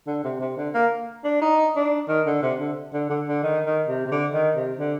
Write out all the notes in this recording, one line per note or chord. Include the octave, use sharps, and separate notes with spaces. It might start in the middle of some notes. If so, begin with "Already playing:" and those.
D3
C3
C3
D3
A#3
D4
D#4
D4
D#3
D3
C3
D3
D3
D3
D3
D#3
D#3
C3
C3
D3
D#3
C3
D3